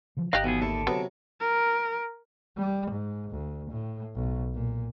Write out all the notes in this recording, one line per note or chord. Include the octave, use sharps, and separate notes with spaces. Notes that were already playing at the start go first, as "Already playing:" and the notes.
C#3 E3 F3
G#1 D#4 G4 D#5 F5 F#6
B1 E3 B3 G#4
D#2 D3 E4 A4 A5
C3 F#3 B3 A#5
A#4
G3
G#2
D2
A2
B1
A#2